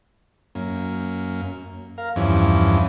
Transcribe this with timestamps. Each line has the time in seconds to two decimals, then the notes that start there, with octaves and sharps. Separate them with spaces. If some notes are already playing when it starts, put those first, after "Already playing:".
0.55 F#2 A#3 C#4
1.98 A#4 F5
2.16 E2 G2 E3 F3 C#4